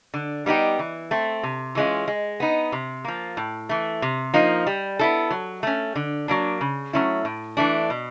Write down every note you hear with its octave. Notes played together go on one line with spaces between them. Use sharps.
D3
G3 B3 D#4 G4
E3
A3 C4
C3
E3 G#3 C#4 F4
G#3
B3 D#4
C3
F3 A#3
A2
E3 A3
C3
F3 A#3 D#4
G3
B3 E4 A4
F#3
A3 C#4
D3
F#3 A#3 D4
C#3
F#3 A3 C#4 E4
A2
E3 A3 D4
B2